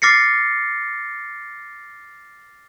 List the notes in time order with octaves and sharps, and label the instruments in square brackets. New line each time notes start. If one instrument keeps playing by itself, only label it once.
[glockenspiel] D6 F6 A6 A#6 C7 C#7